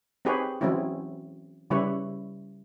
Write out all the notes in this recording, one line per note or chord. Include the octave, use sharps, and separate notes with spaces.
C4 D#4 G4 G#4 B4 C#5
E3 F#3 G#3 C4 C#4 E4
C#3 G3 E4 B4 C#5